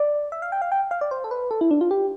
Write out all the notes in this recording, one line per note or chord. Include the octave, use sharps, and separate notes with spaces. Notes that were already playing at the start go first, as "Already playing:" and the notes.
Already playing: D5
E5
F5
G5
F5
G5
F5
D5
C5
A4
B4
A4
E4
D4
F4
G4